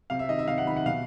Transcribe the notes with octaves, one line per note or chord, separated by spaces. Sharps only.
C3 F5
E5
D#3 D#5
E5
C3 F5
F#5
D#3 B5
F#5
B2 F5